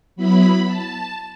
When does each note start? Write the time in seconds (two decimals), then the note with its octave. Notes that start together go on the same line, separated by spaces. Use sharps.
0.16 F#3 B3 E4 B5
0.66 A5